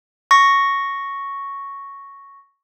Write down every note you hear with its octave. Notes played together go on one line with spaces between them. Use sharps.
C#6 A#6